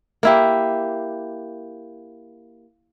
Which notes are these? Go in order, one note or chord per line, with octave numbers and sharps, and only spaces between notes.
A#3 E4 G4